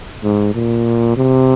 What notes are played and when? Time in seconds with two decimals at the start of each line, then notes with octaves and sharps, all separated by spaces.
0.23 G#2
0.55 A#2
1.17 C3